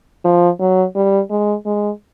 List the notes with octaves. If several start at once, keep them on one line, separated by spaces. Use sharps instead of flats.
F3
F#3
G3
G#3
G#3